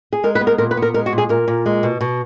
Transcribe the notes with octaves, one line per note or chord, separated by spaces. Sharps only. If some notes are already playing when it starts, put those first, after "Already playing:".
G#4
G#3 A#4
B4
B3
A#4
A#2 A#4
B4
B3
A#4
G#3 A#4
F#4
A#2
G#4
A#2 A#4
A#2
G#3
B2
B2